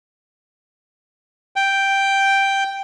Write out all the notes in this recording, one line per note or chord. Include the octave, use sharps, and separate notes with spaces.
G5